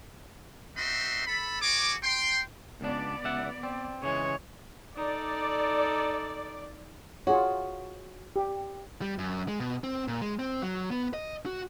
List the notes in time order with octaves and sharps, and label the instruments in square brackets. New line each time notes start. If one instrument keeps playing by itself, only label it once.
[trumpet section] C4 D#4 F#4 E5 C6
A4 B5
F#4 G#4 C#5 D6
G5 C6
[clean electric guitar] C#2 D4 [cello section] B3 D5
[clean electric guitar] C#2 E5 F#5
C4
[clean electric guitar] C#3 E3 G#3 [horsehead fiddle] C#5
[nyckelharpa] D#4 A4 [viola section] D5
[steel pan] F4 G#4 C#5 [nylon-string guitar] F#4
[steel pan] G4
[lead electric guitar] G3
F#2
G#3
B2
C4
A#2
G#3
C4
F#3
B3
D#5
F#4